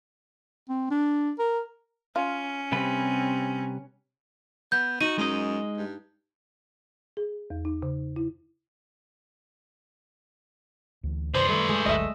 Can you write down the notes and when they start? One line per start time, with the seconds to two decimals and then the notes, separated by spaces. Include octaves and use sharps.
0.69 C4
0.91 D4
1.39 A#4
2.16 C#4 F4
2.72 C3 G3 C4 B4
4.72 B3 G6
5.00 D#4 F#4 D#7
5.18 F#2 G#3 D#5
5.77 G2
7.17 G#4
7.50 E2
7.65 D#4
7.82 C#3
8.16 E4
11.04 D2 E3
11.34 F#2 C3 D#3 B4 C5 D5 C6
11.49 D#3 G3 A3
11.69 G#3
11.85 G1 D2 F#3 D#5 E5